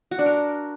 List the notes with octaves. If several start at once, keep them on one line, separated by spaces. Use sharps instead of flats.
F#4
D4
A#4